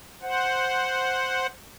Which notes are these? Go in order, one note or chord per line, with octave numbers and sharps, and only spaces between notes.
C5 F#5